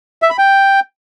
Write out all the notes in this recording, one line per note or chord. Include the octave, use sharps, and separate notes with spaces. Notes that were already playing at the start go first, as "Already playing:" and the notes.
E5
B5
G5